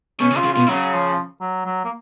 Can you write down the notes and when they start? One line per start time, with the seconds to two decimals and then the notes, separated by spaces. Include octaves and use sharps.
0.20 B2 C#4
0.32 C#3
0.36 F4
0.44 C#3
0.52 B2 F4
0.68 C#3 F#3
0.93 F3
1.41 F#3
1.65 F#3
1.84 A#3